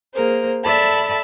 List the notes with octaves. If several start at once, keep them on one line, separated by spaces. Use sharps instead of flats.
A#3 G#4 A#4 C5
A4 D5 E5 A5 B5